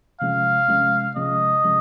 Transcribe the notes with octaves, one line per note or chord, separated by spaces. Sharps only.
C3 F3 G#3 C#4 F5
C3 F3 G#3 C#4
C3 F3 G#3 C#4 D#5
C3 F3 G#3 C#4